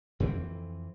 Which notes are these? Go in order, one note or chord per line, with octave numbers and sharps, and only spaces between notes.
F2 E3 C4